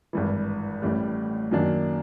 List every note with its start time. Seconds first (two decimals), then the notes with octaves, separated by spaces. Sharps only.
0.13 G#1 G2 E3
0.82 A1 A2 E3 G3
1.51 F#2 D#3 F#3 A#3 D4